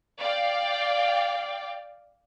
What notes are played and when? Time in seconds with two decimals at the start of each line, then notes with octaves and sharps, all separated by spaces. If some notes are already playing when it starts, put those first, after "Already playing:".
0.21 D5 F5 G5